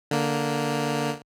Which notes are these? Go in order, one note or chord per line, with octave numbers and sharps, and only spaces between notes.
D3 A#3